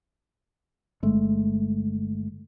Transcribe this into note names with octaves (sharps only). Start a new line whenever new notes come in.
G1 G#3 A3